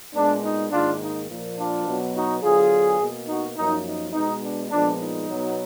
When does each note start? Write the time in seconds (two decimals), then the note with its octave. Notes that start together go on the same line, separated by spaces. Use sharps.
0.14 A#2 G#3 B3 D4
0.43 D#4
0.72 G#2 D#3 A#3 D4 F4
1.00 D#4
1.29 A#2 F3 A#3
1.57 D4 F4
1.85 B2 F#3 B3
2.14 D#4 F#4
2.42 D3 F#3 B3 F4 G#4
3.00 B2 A#3
3.28 D#4 F#4
3.56 F#2 F3 A#3 D#4
3.85 D#4
4.13 B2 G#3 B3 D#4
4.41 D4
4.70 A#2 F3 G#3 B3 D4
4.99 D#4
5.27 B2 F#3 B3